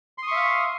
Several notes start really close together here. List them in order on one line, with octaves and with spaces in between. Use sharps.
C6 D#6 C#6 E5 F5